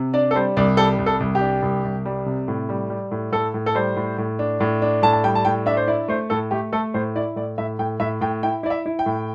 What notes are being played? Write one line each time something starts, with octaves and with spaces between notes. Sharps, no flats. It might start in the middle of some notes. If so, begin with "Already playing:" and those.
Already playing: C3
D4 D5
A4
G3 C5
C2 D5
G3 A4
C2
A4
C2
G4
D4
C2
C2
G3
C3
A2
G3
G3
A2
A2 A4
A2
A4
G3 C5
A2
A2
D4
A2
D4
A2 A5
A5
G3 G5
A5
A2 G5
D4 E5
C5
E4 D5
A3 C5
A2 A4
A3 G4
A3 A4
A2 C5
E4 D5
A2 D5
A2 E5
A2 G5
A2 E5
A2 G5
E4 G5
E4 D5
E5
E4
G5
A2